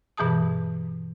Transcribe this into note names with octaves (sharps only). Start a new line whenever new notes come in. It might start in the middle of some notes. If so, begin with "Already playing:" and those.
G2 B2 E3 G#4 A5 D#6